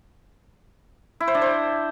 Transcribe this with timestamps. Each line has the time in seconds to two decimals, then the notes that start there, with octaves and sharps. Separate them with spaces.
1.20 E4
1.27 C5
1.35 D4
1.42 C5